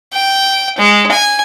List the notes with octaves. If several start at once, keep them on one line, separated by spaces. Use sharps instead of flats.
G5
G#3
G#5